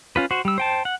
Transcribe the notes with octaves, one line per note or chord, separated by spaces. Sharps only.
C#4 F4 B4
F#4 C5
G3 E6
C5 G5 A5
F#5